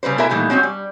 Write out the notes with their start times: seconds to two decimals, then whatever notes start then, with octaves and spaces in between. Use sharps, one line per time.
0.03 C#3 G3 B4 C5
0.18 B2 E4 A4 A#4 E5 G#5
0.30 A#2 D#3 E3 G3 A3
0.50 G#3 C4 C#4 F#4
0.63 G3